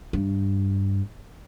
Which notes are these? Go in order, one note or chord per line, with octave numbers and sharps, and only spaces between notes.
G2